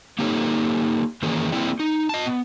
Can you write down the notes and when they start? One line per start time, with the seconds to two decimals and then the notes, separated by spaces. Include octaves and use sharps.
0.19 A#3 D#4 G4 A4 C#5
1.22 D#3 E3 A#3 C#4 G#4
1.52 A#3 C4 E4 G#4 D5 G5
1.80 D#4
2.09 D#5 A5
2.26 B3